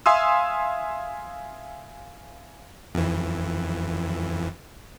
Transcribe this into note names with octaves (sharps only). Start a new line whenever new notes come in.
E5 F5 G#5 C6 D#6 E6
F2 E3